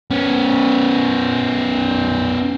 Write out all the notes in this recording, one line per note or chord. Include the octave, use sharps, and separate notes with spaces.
B3 C#4